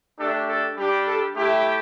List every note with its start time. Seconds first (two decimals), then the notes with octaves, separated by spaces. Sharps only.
0.18 A3 D4 G4 A4
0.47 A4
0.77 G3 D4 G4
1.06 A4
1.36 A3 E4 G4